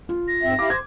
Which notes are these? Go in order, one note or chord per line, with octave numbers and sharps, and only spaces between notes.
F4
A#6
G#2 C4 E5
E4 G4 F5 D6
C5 G#6